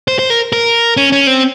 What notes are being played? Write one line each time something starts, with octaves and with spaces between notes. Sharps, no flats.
C5
C5
A#4
A#4
C#4
C#4
C4